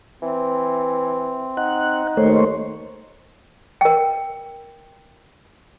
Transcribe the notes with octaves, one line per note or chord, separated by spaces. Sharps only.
E3 C4
D#4 F#5
D#2 D#3 A3 C5 C#5
A#4 G5